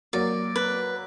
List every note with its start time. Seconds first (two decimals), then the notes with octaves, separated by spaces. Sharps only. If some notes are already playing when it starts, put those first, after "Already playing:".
0.13 F#3 A#3 D5
0.56 B4